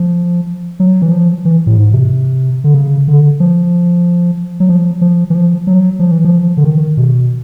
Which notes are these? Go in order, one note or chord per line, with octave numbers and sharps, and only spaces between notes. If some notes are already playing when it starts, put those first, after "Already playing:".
Already playing: F3
F#3
E3
F3
E3
A2
G#2
C3
D3
C#3
D3
F3
F#3
F3
F3
E3
F3
F#3
F3
E3
F3
D3
D#3
B2